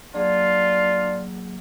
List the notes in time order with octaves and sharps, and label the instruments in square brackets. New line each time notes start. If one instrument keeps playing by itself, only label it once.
[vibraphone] F#3 A#3 G#4 [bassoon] D4 [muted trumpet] F4